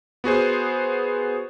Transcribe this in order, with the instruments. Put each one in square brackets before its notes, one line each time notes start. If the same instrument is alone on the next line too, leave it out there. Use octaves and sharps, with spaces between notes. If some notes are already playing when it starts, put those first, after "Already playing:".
[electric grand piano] B3 F#4 G#4 C5